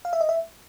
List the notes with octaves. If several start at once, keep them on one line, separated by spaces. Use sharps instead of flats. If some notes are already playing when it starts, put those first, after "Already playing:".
F5
E5
D#5
E5